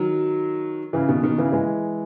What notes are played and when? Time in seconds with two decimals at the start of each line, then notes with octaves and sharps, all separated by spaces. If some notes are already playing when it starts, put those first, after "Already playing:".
Already playing: D#3 F#3
0.93 C#3 E3
1.08 B2 D#3
1.23 B2 D#3
1.38 C#3 E3
1.52 E3 G#3